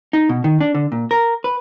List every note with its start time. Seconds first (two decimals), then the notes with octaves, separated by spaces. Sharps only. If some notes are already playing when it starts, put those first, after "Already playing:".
0.13 D#4
0.29 B2
0.44 D#3
0.61 D4
0.75 D3
0.92 A#2
1.11 A#4
1.44 B4